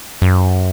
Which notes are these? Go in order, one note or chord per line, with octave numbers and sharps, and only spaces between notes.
F#2